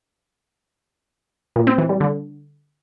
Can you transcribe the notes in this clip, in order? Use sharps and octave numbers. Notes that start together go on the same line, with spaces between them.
A#2
C4
E3
G3
D3